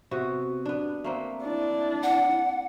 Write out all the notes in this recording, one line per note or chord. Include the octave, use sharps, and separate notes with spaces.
C3 B3 F#4
B3 D4
A3 A#3 C4
D4 E4
F#5